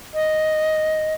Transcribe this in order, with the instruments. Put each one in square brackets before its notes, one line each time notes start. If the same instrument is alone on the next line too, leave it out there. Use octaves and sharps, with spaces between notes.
[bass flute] D#5